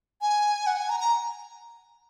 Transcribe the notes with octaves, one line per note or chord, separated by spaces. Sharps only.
G#5
F#5
G#5
A#5
A#5